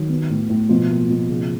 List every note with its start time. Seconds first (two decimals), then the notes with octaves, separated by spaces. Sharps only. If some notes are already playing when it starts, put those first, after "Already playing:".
Already playing: D#3 F#3 D#4
0.09 B3
0.30 A2
0.49 A2
0.69 B2 F3 F4
0.90 A#3
1.10 B2
1.29 C#3